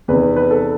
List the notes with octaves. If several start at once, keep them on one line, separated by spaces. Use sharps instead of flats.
E2 C3 D#3 B4
B4
A4